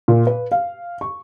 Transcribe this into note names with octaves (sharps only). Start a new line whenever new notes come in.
A#2
B4
F5
C#6